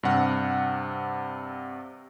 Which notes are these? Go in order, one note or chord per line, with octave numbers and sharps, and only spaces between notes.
G2 C3 F#5 F6